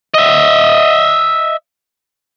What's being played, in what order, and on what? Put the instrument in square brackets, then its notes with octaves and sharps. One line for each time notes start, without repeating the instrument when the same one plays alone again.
[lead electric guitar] D#5 E5